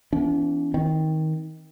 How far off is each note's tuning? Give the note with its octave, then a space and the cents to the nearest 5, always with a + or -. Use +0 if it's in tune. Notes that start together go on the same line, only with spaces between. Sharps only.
E3 +25 B3 +20 D4 -45
D#3 +20 C4 +0